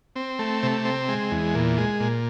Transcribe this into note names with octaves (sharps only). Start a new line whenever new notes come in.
C4
A3
C3
C4
G#3
E2
A#2
G#3
A#2